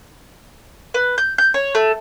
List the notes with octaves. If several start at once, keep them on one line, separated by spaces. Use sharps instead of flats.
B4
G6
G6
C#5
A3